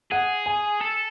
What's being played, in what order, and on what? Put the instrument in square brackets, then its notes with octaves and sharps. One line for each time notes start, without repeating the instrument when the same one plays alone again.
[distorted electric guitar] G#4 [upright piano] F#5
[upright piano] G#5
[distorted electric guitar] A4